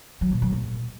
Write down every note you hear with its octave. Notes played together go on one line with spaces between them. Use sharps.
F#3
A#2
F#3
A#2